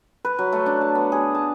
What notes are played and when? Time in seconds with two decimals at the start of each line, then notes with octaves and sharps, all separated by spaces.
0.25 B4
0.39 F#3
0.52 A3
0.66 D4
0.81 A5
0.95 B3
1.12 G#4
1.35 A5